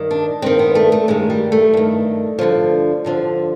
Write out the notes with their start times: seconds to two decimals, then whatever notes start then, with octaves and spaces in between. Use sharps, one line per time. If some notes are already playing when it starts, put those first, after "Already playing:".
Already playing: G2 D#3
0.11 D4
0.42 G2 D#3 C4
0.59 B3
0.75 A3
0.92 A3
1.08 G2 D#3 G#3
1.30 G3
1.52 A3
1.74 G2 D#3
2.39 G2 D3 F3
3.05 G2 D3 F3